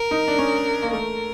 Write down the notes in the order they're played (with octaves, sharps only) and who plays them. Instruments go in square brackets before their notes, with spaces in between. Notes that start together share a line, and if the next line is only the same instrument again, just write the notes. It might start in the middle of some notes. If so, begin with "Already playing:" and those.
Already playing: [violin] A#4
[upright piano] D#4
D4
C#4
A#3
[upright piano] A3 [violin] A#4